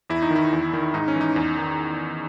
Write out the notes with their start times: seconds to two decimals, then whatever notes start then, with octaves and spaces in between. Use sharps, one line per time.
0.10 E2 E4
0.22 D#4
0.31 D#3
0.36 E4
0.52 E2
0.73 D#3
0.94 G#2 D#4
1.08 C#4
1.15 E3
1.21 D#4
1.36 E2
1.57 D#3